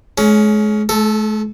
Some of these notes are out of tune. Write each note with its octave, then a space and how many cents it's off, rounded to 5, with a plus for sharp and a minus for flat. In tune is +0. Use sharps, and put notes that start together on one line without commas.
G#3 +35 C#4 +15
A3 -45 A4 +0